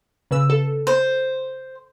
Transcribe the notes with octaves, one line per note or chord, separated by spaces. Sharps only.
C#3 B4 E6
A4
C5